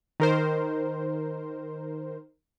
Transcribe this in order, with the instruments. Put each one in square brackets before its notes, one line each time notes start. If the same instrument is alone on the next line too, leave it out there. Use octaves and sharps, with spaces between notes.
[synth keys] D#3 A#4 C5